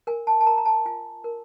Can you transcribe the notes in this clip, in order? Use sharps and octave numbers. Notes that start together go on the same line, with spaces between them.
A#4 G#5
A5
A5
A#4 A#5
A#5
A5
F4 G#5
A#4